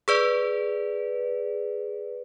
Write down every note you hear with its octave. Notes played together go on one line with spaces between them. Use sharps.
G#4 B4 D5